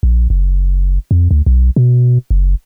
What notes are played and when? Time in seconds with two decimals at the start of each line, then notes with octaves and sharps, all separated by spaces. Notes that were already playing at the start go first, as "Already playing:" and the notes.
0.03 A#1
0.30 F#1
1.11 F2
1.31 D2
1.46 B1
1.76 B2
2.31 F#1